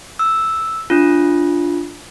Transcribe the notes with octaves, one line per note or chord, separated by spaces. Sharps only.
E6
D4 F4